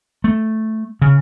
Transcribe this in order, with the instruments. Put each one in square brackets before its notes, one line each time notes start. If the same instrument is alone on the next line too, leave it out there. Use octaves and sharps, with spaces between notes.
[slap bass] A3
C#3